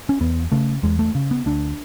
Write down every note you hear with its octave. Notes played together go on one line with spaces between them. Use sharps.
C#4
E2 B3
C#3 A3
E2 G#3
A3
C#3
B3
D2 D4